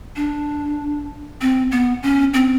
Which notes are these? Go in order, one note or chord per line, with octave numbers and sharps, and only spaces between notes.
D4
C4
B3
C#4
C4